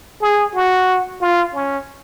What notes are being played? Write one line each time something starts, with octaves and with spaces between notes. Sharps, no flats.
G#4
F#4
F4
C#4